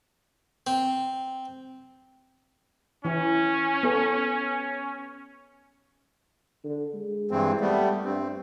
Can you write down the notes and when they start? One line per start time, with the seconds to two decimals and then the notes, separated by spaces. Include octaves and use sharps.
0.67 C4
3.05 E3 C#4 E4
3.83 B3 A4
6.64 D3
6.94 G#3
7.31 G2 E3 C4
7.61 G3 A3 B3
8.05 G2 C4